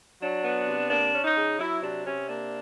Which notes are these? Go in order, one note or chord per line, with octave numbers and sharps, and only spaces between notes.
F#3 D4
B3
C3
A#3 D4
C#4
D#4
C#3
F#3 E4
C3 D4
C3 C#4
A#3 D4